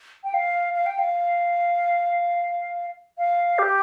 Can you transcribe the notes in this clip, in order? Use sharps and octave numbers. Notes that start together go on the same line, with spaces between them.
G5
F5
F5
G5
F5
F5
G4